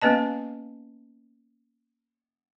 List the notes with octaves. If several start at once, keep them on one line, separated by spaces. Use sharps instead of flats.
A#3 B3 C#4 B4 D#5 A5